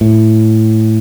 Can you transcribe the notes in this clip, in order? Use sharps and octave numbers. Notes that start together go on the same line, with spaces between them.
A2